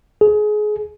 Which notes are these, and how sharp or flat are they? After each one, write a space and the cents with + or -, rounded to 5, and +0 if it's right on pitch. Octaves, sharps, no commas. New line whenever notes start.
G#4 +25